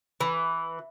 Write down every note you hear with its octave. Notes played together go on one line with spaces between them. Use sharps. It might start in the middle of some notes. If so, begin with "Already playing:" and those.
E3